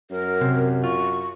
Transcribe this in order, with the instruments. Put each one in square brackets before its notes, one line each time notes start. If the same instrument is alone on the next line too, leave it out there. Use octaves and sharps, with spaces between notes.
[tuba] F#2 [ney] A#4
[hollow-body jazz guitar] C3
[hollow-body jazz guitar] F4 [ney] C#6